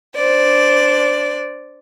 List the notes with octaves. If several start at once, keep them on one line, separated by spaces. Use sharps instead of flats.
D4 C5 D5